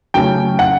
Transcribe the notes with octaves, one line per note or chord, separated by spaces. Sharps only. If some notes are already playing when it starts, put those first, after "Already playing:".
C#3 F#3 A3 C#4 G5
F#5